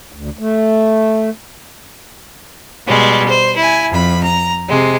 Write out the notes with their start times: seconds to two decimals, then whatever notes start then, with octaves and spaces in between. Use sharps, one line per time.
0.12 D2
0.39 A3
2.87 B2 G3 G#3
3.27 C5
3.56 E4 G#5
3.91 F2 B5
4.22 A#5
4.68 C3 G#3